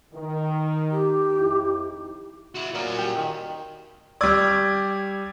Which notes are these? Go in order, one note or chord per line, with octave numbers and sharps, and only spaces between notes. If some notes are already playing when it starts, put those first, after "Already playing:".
D#3
G4
F2 D#4 E4
E4 F#4
A#2 F#4 A#4
G4
D#3
G3 D5 C#6 E6 G#6